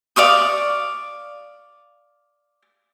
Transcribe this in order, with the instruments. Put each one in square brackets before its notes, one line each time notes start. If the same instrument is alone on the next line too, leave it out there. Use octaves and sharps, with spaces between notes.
[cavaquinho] D5 F5 C#6 D#6